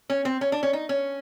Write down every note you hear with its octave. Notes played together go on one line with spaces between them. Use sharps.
C#4
C4
C#4
D4
C#4
D#4
C#4